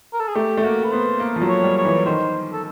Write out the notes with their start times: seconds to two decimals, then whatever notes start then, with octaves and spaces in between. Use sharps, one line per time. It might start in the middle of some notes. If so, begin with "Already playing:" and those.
0.13 A#4
0.20 A4
0.28 G#4
0.35 A3 G4
0.57 A3
0.63 A#3 F#4
0.84 B4
0.91 B3 C5
1.20 A#3
1.36 F3
1.41 F#3
1.49 C#5
1.63 G3
1.77 C#5
1.85 E3
2.06 D#3 C5
2.53 A4